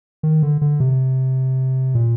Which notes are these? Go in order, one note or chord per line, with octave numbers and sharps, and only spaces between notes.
D#3
D3
D3
C3
A#2